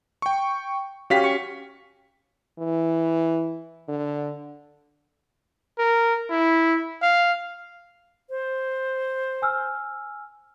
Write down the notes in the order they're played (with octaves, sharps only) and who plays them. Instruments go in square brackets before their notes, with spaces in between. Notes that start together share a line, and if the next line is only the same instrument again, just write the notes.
[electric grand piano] G5 C#6
[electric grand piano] C#4 F5 B6 [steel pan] F#4 G4
[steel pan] C#6
[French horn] E3
D3
[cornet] A#4
E4
F5
[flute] C5
[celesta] G#5 E6 F6